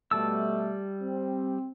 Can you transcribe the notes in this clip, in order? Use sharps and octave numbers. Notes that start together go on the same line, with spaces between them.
B2 G3 A3 A5 E6
C4